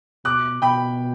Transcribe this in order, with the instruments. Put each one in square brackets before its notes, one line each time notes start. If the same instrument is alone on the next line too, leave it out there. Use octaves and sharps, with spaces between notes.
[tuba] B2 [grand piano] D6 F#6
[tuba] B2 [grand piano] G5 B5